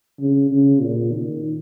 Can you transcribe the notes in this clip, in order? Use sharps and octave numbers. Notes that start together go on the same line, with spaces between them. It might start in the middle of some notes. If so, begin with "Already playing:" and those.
C#3
C#3
A#2
D#3